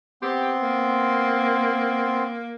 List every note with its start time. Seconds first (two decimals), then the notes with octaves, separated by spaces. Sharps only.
0.22 B3 C4 G4 C6
0.63 A#3